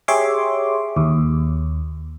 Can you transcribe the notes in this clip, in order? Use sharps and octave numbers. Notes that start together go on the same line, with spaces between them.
G4 G#4 C#5 E5 C6 D6
D#2